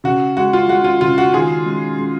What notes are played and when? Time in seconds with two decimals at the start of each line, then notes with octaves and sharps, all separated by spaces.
0.04 C#3 F#4
0.37 G#3 F#4
0.53 F4
0.68 G#3 F#4
0.84 F4
1.01 C#3 F4
1.18 F#4
1.33 D#3 F4 G#4
1.66 G#3
1.99 G#3